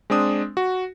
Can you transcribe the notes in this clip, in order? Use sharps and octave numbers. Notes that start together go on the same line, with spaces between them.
G#3 C4 D4 D#6
F#4